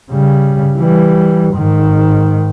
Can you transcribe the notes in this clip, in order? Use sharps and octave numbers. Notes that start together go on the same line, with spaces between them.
C#3 G3
E3 G3
G#2 D#3